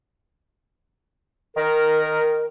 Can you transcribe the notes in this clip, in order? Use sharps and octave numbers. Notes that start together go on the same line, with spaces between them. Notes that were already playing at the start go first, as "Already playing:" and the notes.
D#3 A#4